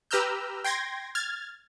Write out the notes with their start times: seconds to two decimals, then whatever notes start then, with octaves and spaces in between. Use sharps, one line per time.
0.11 G4 B4 A#5 E6 F6 G6
0.64 G5 C6 G#6 A#6
1.15 F6 G#6 A6